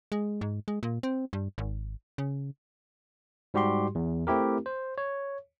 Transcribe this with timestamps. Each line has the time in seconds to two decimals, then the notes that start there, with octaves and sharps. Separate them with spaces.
0.12 G#3
0.41 G#2
0.68 G#3
0.83 A#2
1.03 C4
1.33 G2
1.58 G#1
2.18 C#3
3.54 G#2 G3 F#4 G4 C6
3.95 E2
4.27 A3 C4 E4 G4 A#4
4.66 C5
4.98 C#5